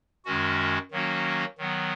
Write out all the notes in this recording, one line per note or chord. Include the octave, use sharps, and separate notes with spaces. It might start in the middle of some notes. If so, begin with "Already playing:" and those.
F#2 D#3 G#3 C#4 F#4
D#3 F#3 A#3 C#4 F#4
D#3 F#3 B3